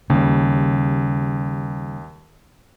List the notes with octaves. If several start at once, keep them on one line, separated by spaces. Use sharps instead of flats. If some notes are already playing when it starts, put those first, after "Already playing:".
D#2 C#3 G3